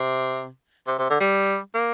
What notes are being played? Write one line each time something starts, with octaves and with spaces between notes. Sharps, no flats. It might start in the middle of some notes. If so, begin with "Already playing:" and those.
Already playing: C3
C3
C3
D3
G3
A#3